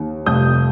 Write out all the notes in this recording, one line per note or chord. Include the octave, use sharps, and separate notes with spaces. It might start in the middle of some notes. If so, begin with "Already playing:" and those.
Already playing: D#2 D#3
F1 F2 C3 G3 D#6 G6